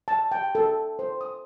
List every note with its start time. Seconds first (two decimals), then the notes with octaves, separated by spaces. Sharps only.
0.08 A5
0.32 G5
0.55 A4
0.99 C5
1.21 D#6